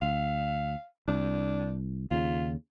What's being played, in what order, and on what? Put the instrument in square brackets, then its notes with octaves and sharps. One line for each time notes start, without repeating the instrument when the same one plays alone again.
[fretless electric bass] D2 [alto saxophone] F5
[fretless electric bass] C2 [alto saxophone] D4
[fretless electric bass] D#2 C#3 [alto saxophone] F4